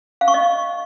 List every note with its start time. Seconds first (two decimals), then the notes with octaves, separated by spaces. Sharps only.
0.21 F5
0.28 C#6
0.34 D#5